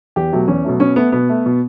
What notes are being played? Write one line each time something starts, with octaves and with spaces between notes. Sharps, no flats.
E2 G4
B2 F#3 A3
E2 C#4
B2 F#3 A3
B2 C#4
A3 B3
B2 B3
A3
B2